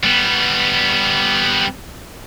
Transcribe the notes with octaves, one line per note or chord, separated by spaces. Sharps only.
G3 B3